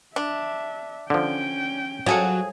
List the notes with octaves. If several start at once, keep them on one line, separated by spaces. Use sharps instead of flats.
D4 E5
D3 F3 C#4 G5
F3 F#3 G#4 A4